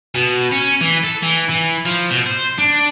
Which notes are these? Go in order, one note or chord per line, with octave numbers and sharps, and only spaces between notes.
B2
C#4
E3
A4
E3
E3
F3
B2
C5
D4